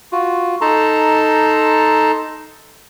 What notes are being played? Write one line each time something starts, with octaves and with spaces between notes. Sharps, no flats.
F4 F#4
D#4 A4 A5 A#5 C6